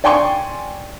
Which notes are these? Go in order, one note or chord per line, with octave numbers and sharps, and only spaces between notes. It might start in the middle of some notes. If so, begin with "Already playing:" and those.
D5 G5 G#5 C6 C#6